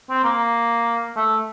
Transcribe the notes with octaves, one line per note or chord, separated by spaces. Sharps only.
C4
A#3
A3